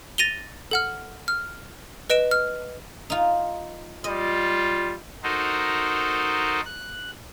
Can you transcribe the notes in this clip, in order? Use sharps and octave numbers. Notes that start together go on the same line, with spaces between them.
A6 A#6 D#7 F7 G7
A4 F#5 F6
F6
B4 D#5 D7 E7
F6
D#4 F4
G3 F4 D#5
D#4 F#4 A4 A#4 C5 D#5
F#6